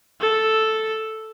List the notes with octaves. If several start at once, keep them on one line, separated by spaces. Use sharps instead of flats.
A4